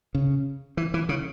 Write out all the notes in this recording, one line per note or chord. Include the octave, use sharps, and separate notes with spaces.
C#3
E3
E3
C#3